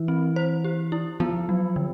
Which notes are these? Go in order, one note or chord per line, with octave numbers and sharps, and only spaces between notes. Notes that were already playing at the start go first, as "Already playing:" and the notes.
Already playing: E3
C4
C5
G4
E4
F3 B3
F#3
D3